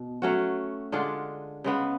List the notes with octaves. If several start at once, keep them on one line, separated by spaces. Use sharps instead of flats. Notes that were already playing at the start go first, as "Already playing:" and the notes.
Already playing: B2
F#3 A3 C#4 F#4
D3 G#3 D4 F4
C#3 G#3 B3